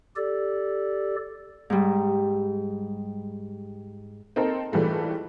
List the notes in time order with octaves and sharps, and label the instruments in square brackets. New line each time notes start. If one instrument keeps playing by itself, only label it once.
[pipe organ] G4 A4 D5
[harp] G#2 G3
[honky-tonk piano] C4 D#4 A4 A#4
G#2 E3 G3 A3 F4